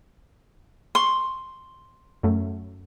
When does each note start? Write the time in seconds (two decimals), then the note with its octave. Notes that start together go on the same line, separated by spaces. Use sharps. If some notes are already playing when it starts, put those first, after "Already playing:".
0.95 C6 C#6
2.23 F#2 A3